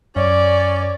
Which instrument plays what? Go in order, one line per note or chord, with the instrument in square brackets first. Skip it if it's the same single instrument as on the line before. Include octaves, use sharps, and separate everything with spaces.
[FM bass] F#2 [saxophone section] C#4 C#5 [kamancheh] D5